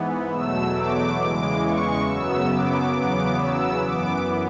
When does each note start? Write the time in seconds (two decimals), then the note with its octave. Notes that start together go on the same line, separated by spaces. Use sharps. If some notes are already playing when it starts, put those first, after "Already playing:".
Already playing: G#2 E3 B3
0.30 E2 B2 F#3 A3 E6
0.74 D6
1.18 E2 C#3 E3 G#3 D6
1.63 C#6
2.05 F#2 C#3 F#3 B3 E6
2.50 D6
2.94 E2 C#3 F#3 B3 D6
3.37 E6
3.81 F#2 E3 B3 D6